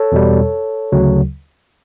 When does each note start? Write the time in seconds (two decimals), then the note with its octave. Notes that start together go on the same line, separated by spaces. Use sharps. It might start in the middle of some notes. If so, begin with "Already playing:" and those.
Already playing: A4 C#5
0.12 E2 B2 G3
0.92 D2 C#3 F#3